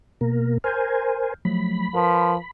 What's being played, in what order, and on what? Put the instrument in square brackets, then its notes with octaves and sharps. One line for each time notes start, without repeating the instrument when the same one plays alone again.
[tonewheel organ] B2 A#3 A#4
[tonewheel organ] A#4 C5 G#5 [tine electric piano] F6 G6
[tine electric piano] F3 F#3 A3 [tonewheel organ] B5
[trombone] F3 [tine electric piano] A#4 B4